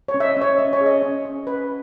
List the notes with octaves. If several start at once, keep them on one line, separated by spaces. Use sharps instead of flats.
C#5
C#4
E5
D#5
C#4
C#5
C#4 D#5
C#5
G#4
D#5
C#4
C#4
B4